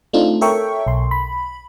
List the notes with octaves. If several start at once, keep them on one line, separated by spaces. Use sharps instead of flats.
A3 C4 D4 D#4 F4
A4 A#4 C#5 E5 G5 C#6
B1 C6
B5